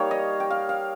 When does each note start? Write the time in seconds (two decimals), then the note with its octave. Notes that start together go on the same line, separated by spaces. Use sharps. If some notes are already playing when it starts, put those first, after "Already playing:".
Already playing: G3 A#3 D#4 C#5 F5 G5
0.11 D#5
0.40 G5
0.50 F5
0.69 F5